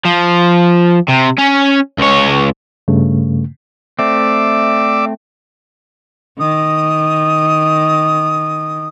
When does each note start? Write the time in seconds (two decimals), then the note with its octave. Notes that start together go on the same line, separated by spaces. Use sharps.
0.05 F3
1.08 C3
1.38 C#4
1.98 C#2 C#5
2.88 G2 C#3 A3
3.99 A3 C4 D5 E5 D6
6.39 D#3 D#6